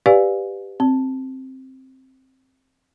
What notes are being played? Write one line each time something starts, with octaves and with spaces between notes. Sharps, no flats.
G4 B4 D5 F5 G#5
C4